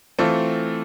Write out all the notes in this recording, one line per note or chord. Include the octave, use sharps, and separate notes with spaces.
E3 A3 C4 F4 A4